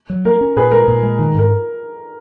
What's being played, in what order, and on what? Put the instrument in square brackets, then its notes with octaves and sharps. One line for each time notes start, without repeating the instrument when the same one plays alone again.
[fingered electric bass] F#3
[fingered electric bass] A#3 [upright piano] A#4
[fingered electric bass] C#4
[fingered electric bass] A#2 [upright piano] G#4 B4
[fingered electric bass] G#3 [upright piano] A#4
[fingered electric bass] A#2
G#3
D#3
[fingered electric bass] G#2 [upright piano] A#4